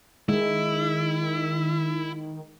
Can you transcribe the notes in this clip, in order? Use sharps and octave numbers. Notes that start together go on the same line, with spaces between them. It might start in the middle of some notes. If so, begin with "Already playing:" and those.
D#3 G#3 E4